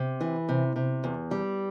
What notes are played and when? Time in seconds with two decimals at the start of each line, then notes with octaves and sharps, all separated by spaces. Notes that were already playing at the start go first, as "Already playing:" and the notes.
Already playing: C3
0.21 E3
0.49 C3
0.76 C3
1.04 E2
1.31 G3